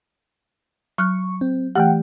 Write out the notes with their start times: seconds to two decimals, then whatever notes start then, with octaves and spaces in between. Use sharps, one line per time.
0.98 F#3 C#6 F6 F#6
1.41 C4
1.75 E3 A3 G4 F#5 G5